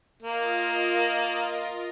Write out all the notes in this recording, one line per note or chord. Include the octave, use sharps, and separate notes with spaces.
A#3 F4 A#4 D#5